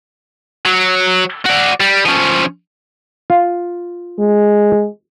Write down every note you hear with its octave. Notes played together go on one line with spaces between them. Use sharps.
F#3
F#4 D5
G3
F3 C#4
F4
G#3